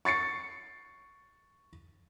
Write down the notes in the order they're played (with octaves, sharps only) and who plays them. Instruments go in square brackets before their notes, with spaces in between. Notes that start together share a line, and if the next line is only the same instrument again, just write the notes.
[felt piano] C#6 A6 C7 C#7